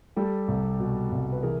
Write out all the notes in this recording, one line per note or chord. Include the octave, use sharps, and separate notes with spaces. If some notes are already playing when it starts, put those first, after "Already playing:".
G3 G4 A4
C2
B2
C2
B4
E3 G#4 A#4